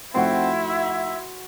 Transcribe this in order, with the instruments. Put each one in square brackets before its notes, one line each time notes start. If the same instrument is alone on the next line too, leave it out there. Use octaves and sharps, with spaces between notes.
[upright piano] F2 A3 D#4 [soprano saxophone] C4 [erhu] E4 [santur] F#4 F#5 C6
[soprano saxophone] E5